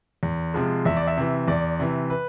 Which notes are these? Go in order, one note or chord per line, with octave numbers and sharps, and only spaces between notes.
E2
C3 F3 G#3
E2 E5
D5
E5
C3 E3
E2 D5
C3 E3
B4